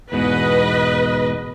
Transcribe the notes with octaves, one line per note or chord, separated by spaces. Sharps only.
E2 G#2 B2 B4 D#5